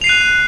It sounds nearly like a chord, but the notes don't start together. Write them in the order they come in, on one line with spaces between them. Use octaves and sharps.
F7 C7 D#7 F#6